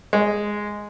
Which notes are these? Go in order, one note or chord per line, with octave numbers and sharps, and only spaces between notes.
G#3